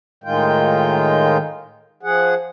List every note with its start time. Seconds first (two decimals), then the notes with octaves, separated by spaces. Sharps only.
0.24 A2 D#3 G#3 F4 G5
2.03 F3 G#4 F#5